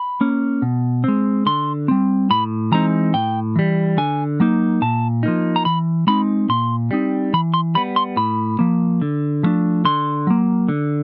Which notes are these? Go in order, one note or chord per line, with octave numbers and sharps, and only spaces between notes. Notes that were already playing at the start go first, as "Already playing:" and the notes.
Already playing: B5
A#3 C#4
B2
G#3 C4
D3 C6
G3 C4
A2 B5
E3 G#3 C4 D#4 A#5
A2 G5
E3 G3
D3 G#5
F#3 A#3 D#4
A#2 A5
F3 A#3 D#4
A#5
E3 B5
G#3 C4 D#4 B5
A#2 C6
G3 C4 D#4
E3 B5
C6
G3 B3 B5
C6
A2 B5
F3 A#3
D3
F3 A3 D4
D3 C6
F#3 A#3
D3